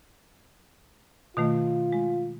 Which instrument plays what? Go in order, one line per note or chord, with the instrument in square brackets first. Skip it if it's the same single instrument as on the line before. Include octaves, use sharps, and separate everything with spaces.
[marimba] B2 D#3 A3 [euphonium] F4
[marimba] G#3